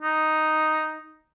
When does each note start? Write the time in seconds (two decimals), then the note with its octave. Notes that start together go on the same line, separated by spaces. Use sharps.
0.02 D#4